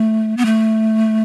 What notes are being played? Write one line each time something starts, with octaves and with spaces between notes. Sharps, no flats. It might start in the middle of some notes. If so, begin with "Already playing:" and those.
Already playing: A3
B3
A3